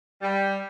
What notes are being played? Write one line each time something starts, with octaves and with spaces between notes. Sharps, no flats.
G3